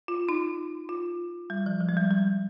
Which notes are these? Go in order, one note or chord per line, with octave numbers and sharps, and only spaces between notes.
F4
D#4
F4
G3
F3
F3
G#3
G3
G3